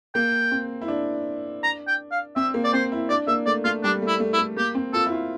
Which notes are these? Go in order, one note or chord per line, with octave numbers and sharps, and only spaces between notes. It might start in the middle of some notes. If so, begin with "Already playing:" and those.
A#3 G5
C4
E4
D4
A#5
G5
F5
C4 E5
A#3
D5
C4 C5
E4
D4 D5
A#3 E5
A3 D5
A3 F4
G3 D4
A3
E4
A3
E4
A3
A#3 G4
C4
F4 A4
E4
F4